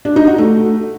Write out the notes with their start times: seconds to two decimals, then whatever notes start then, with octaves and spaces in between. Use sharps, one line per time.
0.05 D4
0.16 D#4
0.27 F#4
0.38 A3